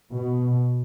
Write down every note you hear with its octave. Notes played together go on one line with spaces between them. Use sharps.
B2